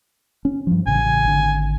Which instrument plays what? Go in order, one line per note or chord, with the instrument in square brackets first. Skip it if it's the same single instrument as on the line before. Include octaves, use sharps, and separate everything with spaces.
[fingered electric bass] C#4
G2 F3
[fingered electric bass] A1 C#3 [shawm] G#5
[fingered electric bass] G#1 D3